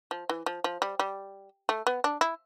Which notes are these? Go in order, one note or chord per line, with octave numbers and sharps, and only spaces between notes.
F3
E3
F3
F3
G3
G3
A3
B3
D4
E4